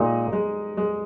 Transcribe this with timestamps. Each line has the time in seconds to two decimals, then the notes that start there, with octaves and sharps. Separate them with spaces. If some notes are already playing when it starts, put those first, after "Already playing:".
Already playing: A#2 G#3 D#4
0.33 G#3
0.77 G#3